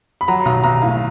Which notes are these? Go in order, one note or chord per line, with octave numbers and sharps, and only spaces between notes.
B5
F#3 A#5
B1 A#5
B1 A#5
A2 F5